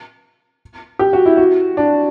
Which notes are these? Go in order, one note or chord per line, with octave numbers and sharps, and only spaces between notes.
G4
F#4
E4
F#4
D4